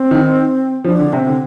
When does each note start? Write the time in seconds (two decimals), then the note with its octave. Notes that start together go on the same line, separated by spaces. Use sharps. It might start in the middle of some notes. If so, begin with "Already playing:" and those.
Already playing: C4
0.11 D#3
0.84 F3 D4
0.99 D3
1.13 C3 C4
1.27 D3